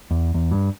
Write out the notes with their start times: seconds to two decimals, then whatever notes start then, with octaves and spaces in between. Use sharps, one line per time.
0.11 E2
0.34 E2
0.51 G2